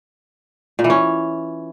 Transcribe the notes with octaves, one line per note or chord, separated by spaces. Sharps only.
A#2
E3
C#4